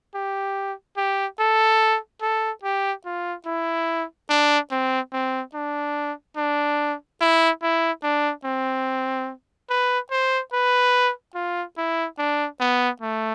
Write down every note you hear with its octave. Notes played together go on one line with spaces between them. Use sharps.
G4
G4
A4
A4
G4
F4
E4
D4
C4
C4
D4
D4
E4
E4
D4
C4
B4
C5
B4
F4
E4
D4
B3
A3